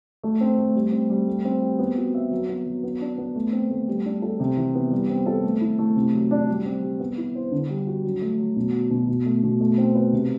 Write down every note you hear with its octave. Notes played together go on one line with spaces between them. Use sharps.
A3
C4
A3
G3
C4
G3
A3
C4
G4
B3
F#4
E5
F#3
B3
F#3
B3
D4
B3
A3
C4
A3
G3
D4
A4
C3
E3
B3
G3
C4
A4
A3
E4
A3
C3
F#3
D4
G3
C4
G3
B3
E4
C5
D3
G3
F#4
F#3
A3
F#3
B2
F#3
B2
B2
A3
B2
A3
C4
B4
C3